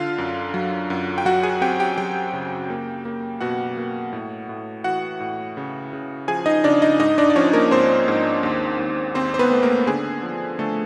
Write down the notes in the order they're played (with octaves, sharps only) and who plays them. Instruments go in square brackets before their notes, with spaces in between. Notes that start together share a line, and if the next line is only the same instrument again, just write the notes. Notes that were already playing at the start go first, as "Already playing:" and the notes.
Already playing: [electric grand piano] D3 F4 F5
F#2
F#3
F#2
G5
F#3 F#4 F#5
G#4 G#5
C4 G4 G5
G4 G5
F#3 G4 G5
C#3
A#3
A#3
B2 F#4 F#5
A#3
A2
A2
E3 F#4 F#5
A2
C#3
C#3
F3 G#4 G#5
D#4 D#5
C#3 D4 D5
D#4 D#5
G#2 D#4 D#5
D4 D5
D5
F3 C#4 C#5
A#3 A#4
G#2 C4 C5
G#2
D#2
D#2
D#2 C4 C5
C5
B3 B4
A3
A#3 A#4
D3 G#4
F3
D3 A3 A4